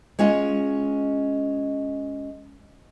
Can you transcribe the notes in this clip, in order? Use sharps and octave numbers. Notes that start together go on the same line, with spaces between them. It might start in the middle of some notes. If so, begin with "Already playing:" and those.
G#3 C#4 F4 D#5